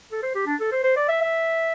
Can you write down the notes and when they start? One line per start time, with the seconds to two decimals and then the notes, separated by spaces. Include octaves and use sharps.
0.12 A4
0.23 C5
0.35 G4
0.46 D4
0.60 A4
0.72 C5
0.84 C5
0.96 D5
1.08 E5
1.21 E5